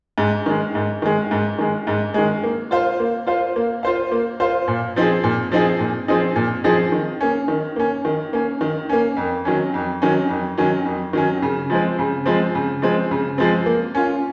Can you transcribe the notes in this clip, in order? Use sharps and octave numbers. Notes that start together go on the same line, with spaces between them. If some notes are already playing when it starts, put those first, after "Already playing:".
G#2
D#3 G#3
G#2
D#3 G#3
G#2
D#3 G#3
G#2
D#3 G#3
A#3
F4 C5 F5
A#3
F4 C5 F5
A#3
F4 C5 F5
A#3
F4 C5 F5
A#2
F3 C4 D#4 G#4
A#2
F3 C4 D#4 G#4
A#2
F3 C4 D#4 G#4
A#2
F3 C4 D#4 G#4
D#3
A#3 C#4
D#3
A#3 C#4
D#3
A#3 C#4
D#3
A#3 C#4
F2
D#3 F#3 C#4
F2
D#3 F#3 C#4
F2
D#3 F#3 C#4
F2
D#3 F#3 C#4
C#3
F3 G#3 C4
C#3
F3 G#3 C4
C#3
F3 G#3 C4
C#3
F3 G#3 C4
A#3
C#4 F4